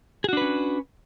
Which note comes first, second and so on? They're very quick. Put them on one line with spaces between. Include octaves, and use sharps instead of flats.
G#4 F#4 D4 B4 C#4